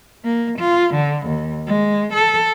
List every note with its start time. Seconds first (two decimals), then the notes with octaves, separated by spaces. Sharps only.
0.24 A#3
0.59 F4
0.94 D3
1.27 D#2
1.67 G#3
2.13 A4